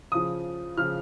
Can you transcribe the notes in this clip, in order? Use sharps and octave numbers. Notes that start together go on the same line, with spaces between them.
C#3 F3 D#6
C#3 F3 F6